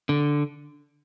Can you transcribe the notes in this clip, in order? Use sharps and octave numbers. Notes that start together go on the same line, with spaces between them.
D3